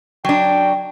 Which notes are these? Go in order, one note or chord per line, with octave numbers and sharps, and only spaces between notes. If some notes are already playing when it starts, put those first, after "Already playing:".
F#3 D4 G5